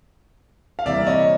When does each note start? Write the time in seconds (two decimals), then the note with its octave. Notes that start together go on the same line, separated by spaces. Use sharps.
0.79 F5
0.86 C3 E3 G3 A#3 D5 E5
1.06 C#5 D#5